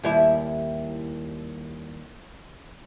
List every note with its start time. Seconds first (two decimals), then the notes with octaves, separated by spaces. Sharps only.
0.03 D#2 G3 E4